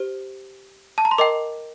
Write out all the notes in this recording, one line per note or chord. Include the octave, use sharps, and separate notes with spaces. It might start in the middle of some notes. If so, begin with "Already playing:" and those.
Already playing: G4 C5
A5
A#5
C6
A#4 D#5 G5 D6